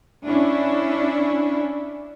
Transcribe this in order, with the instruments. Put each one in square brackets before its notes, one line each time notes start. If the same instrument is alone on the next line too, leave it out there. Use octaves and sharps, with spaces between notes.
[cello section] C#4 D4 E4